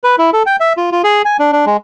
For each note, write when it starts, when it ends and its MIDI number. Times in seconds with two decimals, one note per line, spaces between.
0.04 0.16 71
0.18 0.30 64
0.33 0.43 69
0.46 0.56 79
0.60 0.73 76
0.77 0.90 65
0.92 1.02 65
1.04 1.22 68
1.25 1.37 80
1.39 1.52 62
1.53 1.65 62
1.66 1.77 56